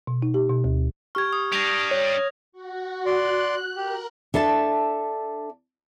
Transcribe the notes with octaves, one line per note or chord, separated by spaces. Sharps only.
B2
D#4
G4
B2
D2
G4 C#6 F6 G#6
D#6
G3 D4 A#6 F7
C#5
F#4
D5 C6 F#6
G4 A#4
D4 A4 E5 A5